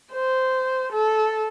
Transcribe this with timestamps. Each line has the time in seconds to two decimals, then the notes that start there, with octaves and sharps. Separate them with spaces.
0.14 C5
0.93 A4